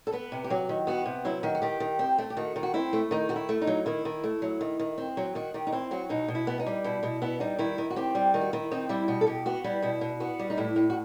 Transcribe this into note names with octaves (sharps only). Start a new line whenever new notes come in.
A4
B3 B4
C3
G4
F#3 F#4
D#3
B3 F#4
C3
F#3 E4
D#3 F#4
F#4
D#3 G4
D#3
C4
A3
G4
D#3 F#4
D#3
F#4
C4 E4
A3
D#3 D#4
D#3 F#4
E4
A3
D#4
F#3
D#3 E4
D#3
A3
F#3
D#3
D#3
C4
F#3
D#3 F#4
D#3 G4
D#4
C4 E4
F#3 F#4
B2 D#4
B2
E4
B3
D#4
G3
B2 E4
B2 E4
B3 E4
G3 D#4
D#3 E4
D#3
F#4
C4 G4
G3
D#3
F#4
D#3 E4
C4 D#4
G3 E4
B2 F#4
A4
B2 G4
B3 F#4
G3 E4
B2 E4
B2
B3 F#4
G3
D#4
A2 E4
A2
F#4